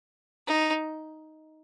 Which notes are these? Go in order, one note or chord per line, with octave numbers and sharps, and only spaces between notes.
D#4